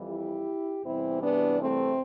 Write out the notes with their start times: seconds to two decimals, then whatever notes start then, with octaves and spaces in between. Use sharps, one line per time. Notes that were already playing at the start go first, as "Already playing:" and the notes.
Already playing: F2 E3 G3
0.09 E4 G4
0.84 E2 C3 E3 G3 C4 E4
1.22 B3 D4
1.60 A3 C4